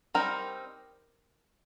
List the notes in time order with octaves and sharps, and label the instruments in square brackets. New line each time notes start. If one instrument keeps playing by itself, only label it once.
[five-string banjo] G3 C4 D#4 A#4